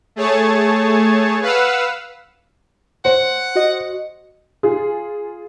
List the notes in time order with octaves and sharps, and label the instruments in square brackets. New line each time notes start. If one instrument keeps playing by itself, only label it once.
[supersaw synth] A3 G#4 C#5 A5
B4 F5 F#5 E6
[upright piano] C5 [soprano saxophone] F#5
[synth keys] F#4 D#5
[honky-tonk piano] F4 G#4